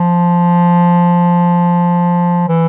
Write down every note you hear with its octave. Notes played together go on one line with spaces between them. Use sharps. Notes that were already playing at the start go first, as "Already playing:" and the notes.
Already playing: F3
E3